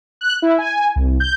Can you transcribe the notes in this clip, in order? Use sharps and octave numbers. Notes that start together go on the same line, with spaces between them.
F#6
E4
G#5
C2
G6